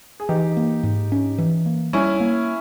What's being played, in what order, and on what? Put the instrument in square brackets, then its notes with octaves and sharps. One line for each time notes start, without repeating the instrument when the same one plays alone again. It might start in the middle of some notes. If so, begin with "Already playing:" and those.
[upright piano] G#4
[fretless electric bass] E3 [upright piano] D#4 G4
[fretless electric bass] A#3
G#2
C#4
E3
A#3
[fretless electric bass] G3 [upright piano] C#4 E4
[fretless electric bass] A#3